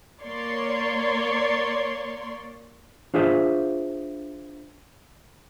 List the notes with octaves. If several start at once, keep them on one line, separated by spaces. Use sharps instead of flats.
A#3 C#5 D5 C6
D4 F4 G#4 C5 E5